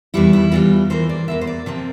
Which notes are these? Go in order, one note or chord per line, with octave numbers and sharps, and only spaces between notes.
E2 E3 G3 E4
E4
E2 E3 G3 F4
E2 E3 A#3 C5
D5
E2 E3 A#3 E5
C5
D5
C3 F3 C4 A#4